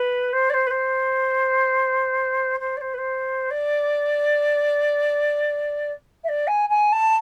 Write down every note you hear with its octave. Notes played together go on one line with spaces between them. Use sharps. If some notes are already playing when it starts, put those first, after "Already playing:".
Already playing: B4
C5
D5
C5
B4
C5
C5
D5
C5
B4
C5
D5
E5
D5
G#5
G#5
A5